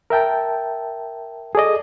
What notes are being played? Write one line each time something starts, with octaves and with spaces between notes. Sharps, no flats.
A#4 E5 G5 A5
G#4 A4 D5 D#5